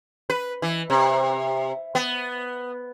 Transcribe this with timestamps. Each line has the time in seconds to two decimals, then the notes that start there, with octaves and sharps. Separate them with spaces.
0.30 B4
0.62 E3
0.90 C3
1.95 B3